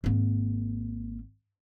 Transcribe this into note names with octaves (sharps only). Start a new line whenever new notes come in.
G#1 A#3